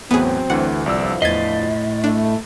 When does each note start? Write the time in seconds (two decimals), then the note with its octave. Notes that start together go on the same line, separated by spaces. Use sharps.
0.11 E2 A2 F#3 B3 C4 G#4
0.50 D2 D3 E3 F#5
0.86 C2 D3 E3 F3 D5 E6
1.22 E2 A2 D#5 G#6 A6 B6 C7
2.04 A3 D4